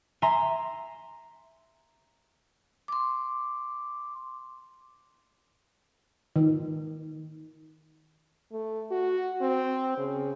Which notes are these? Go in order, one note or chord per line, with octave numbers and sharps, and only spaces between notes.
E5 G#5 A#5 C6
C6 D6
D#3
A3
F#4
C4
C#3